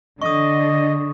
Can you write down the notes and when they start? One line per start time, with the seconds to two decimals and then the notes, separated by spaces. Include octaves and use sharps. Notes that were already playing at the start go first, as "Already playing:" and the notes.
0.22 D3 D#5 C#6 D#6